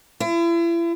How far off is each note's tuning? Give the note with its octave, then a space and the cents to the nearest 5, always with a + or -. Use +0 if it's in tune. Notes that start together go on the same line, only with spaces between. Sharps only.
E4 +40